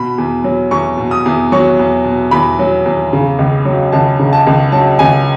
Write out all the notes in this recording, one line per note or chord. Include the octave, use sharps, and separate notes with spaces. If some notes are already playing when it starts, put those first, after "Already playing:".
Already playing: B2 B5
E2
F#3
E2 C#6
B2
D#6
E2
F#3 C#6
E2
B2
E2 B5
F#3
E2
C#3
C#2
F#3
C#2 A5
C#3
A5
C#2
F#3 A5
C#2 G#5